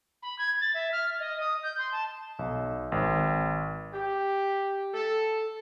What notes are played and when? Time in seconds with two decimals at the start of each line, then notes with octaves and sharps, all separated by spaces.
0.23 B5
0.39 G#6
0.61 A6
0.74 E5
0.92 F6
1.20 D#5
1.40 D#6
1.63 G6
1.78 C6
1.92 A5
2.39 B1
2.92 G#1
3.93 G4
4.94 A4